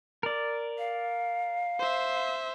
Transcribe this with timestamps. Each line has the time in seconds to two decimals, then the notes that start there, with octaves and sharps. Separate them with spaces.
0.23 A#4 D5
0.78 F5
1.79 C5 E5